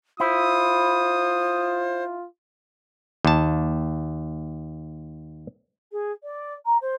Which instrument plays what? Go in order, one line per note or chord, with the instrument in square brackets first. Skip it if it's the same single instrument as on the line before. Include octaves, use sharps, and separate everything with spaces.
[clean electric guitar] E4 [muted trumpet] F4 [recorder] C5 [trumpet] D#6
[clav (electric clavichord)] D#2 A5
[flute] G#4
D5
A#5
C5